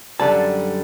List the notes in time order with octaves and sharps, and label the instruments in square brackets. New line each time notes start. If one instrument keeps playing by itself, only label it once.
[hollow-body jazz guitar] F#2 D3 G3 A5